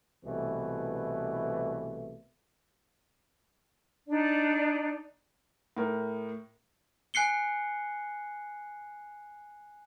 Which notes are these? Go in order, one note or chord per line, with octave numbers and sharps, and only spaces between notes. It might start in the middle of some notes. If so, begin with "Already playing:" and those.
C2 B2 E3 A3
D4 D#4 D5
A2 A#4
G#5 F#6 C7 C#7 G7